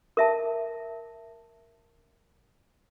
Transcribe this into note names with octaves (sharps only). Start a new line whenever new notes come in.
A#4 E5 A5